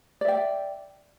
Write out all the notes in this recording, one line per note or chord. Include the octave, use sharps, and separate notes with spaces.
D5 E5 G5